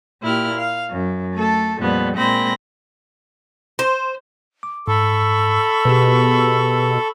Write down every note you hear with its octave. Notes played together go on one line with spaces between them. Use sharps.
A#2 E4 G4 F6
F5
F#2
A3 A4
F2 A#2 G3 B3
A#2 G#3 A#3 C4 B5 A#6
C5
D6
G#2 A4 B5 C#6 E6
B2 G4 G#4 B4